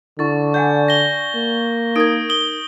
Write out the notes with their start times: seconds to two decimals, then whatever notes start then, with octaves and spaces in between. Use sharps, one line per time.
0.19 D3 E4 C#6 A6
0.54 D5 F#5 G#5 G6
0.88 A#6 G7
1.35 A#3
1.96 D#4 A#4 D#6 G#6 D7
2.29 D#6 F#7 G7